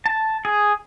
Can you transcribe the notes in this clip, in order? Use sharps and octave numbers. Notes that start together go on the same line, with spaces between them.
A5
G#4